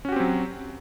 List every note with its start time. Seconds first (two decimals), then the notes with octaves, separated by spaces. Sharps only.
0.05 C#4
0.09 F#4
0.12 G4
0.16 C4
0.20 F#3